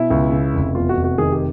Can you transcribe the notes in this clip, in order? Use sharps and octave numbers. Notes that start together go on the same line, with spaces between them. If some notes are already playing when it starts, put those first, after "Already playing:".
Already playing: B2 E4
C#2
C#3
F1
E2 F4
F#4
F1
F#4
D#3 G#4
G4